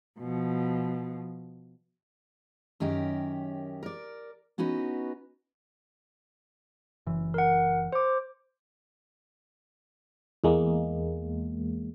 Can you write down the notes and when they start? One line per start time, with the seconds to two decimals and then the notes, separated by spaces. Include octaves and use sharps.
0.19 B2 F3
2.80 F#2 D#3 C#4 G4 A#4
3.83 A#4 D5
4.58 B3 C#4 D#4 F#4 B4
7.06 F#1 E3
7.34 A#4 F#5
7.92 C5 D6
10.44 E2 G#3 A#3